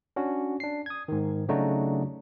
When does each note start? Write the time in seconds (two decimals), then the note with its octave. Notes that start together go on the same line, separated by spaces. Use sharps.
0.16 C#4 D4 F#4
0.60 D4 C7
0.86 D#6 G#6
1.08 G#2 D#3
1.49 C#3 F#3 A3 D4 D#4 F#4